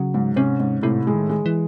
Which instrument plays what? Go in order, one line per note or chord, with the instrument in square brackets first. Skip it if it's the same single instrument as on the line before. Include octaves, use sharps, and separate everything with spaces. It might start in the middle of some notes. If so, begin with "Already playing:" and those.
Already playing: [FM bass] C#3 [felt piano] F#3
[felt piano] G#2
[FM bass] C3 [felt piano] C#4
[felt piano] G#2
[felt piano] A2 [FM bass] C3
[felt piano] G#3
[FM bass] D#3
[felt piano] G#3
[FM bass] E3